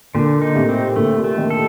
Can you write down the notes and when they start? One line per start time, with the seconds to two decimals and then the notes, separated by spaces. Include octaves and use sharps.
0.14 A#2 D3
0.42 D#4
0.55 A2 C3
0.69 C4
0.96 A#2 D3 A3
1.24 A3
1.37 C3 D#3
1.50 A4